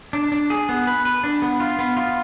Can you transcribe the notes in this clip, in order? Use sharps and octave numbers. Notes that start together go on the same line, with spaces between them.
D4
D4
G#4
B3
B4
B4
D4
B3
F4
B3
F4